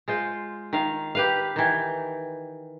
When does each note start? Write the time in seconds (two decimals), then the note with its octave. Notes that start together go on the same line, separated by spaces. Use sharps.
0.08 G#3 F4 C5
0.73 D#3 F5
1.15 G4 B4 F5
1.56 D#3 E3